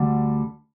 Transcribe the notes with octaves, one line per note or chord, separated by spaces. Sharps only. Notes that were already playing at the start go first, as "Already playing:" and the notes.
Already playing: D2 D3 G3